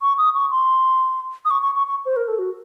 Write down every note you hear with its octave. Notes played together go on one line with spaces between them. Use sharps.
C#6
D#6
C#6
C6
D#6
C#6
C#6
C#6
C#6
C5
A#4
A4
F#4